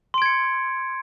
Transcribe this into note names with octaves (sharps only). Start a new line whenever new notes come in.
C6 G#6 C#7 D7